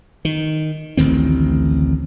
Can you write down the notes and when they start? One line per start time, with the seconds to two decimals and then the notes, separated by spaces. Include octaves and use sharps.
0.25 D#3
0.97 A1 D2 D#3 C4